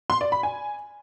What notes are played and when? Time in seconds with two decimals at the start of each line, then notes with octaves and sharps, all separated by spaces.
0.10 C6
0.21 D5
0.32 B5
0.43 G#5